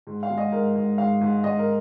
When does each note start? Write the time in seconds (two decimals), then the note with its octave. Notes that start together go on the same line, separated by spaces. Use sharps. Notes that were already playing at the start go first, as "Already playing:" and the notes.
0.07 G#2
0.23 F5
0.30 G#3
0.38 D#5
0.52 G#2 A#4
0.75 G#2
0.98 G#2 F5
1.21 G#2
1.43 G#2 D#5
1.59 A#4